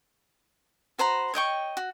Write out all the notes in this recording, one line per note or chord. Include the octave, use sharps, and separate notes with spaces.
F#4 C5 A#5 B5
C#5 D#5 G5 C#6
F#4